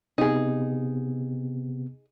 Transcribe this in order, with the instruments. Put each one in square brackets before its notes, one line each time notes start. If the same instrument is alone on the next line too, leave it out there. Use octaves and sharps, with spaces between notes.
[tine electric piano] C3 B3 [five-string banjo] D#4 G#4